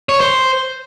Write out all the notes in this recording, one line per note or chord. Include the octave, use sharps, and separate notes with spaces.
C#5
C5